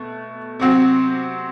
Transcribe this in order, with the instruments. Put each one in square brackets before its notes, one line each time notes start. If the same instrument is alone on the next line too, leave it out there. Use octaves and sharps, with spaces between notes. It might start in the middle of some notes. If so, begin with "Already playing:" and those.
Already playing: [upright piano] B2 A3
C3 F#3 C4 F#4